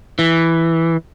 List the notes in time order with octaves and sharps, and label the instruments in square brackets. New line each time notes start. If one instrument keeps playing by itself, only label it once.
[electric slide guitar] E3